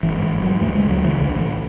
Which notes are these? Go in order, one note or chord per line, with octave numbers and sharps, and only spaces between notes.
G#1 E3
G#2
E3
G#1
F#3
G#2
D2 A3
C#3 G#3
D2 F#3
C#3 E3
B1 D3
A2
E3